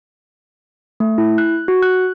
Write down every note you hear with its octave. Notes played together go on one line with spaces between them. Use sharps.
A3
E4
F#6
F#4
F#6